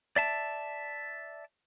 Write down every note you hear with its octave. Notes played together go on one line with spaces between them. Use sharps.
D5 E5 A5